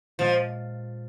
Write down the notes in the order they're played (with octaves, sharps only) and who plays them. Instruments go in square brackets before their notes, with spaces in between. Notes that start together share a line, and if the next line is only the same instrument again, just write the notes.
[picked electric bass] A#2 G#3 C#4 [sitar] F3